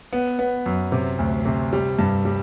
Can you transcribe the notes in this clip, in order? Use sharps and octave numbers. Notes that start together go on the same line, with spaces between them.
B3
B3
F#2
C3
D2
C3
G3
G2
G3